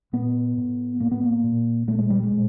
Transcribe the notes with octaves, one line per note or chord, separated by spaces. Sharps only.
A#2 B3
A2
A2 A#3
B3
A#3
A#2
A#2 A3
G#3
G3
G#3
A#2